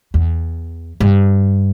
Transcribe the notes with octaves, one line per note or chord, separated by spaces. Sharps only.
E2
G2